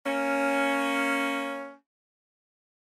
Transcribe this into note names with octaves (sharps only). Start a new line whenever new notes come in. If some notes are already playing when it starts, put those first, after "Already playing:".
A#3 C#4